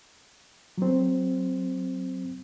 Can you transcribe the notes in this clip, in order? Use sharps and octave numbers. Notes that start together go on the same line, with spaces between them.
F#3 C4